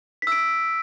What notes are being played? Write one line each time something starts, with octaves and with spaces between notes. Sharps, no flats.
E6 B6 D7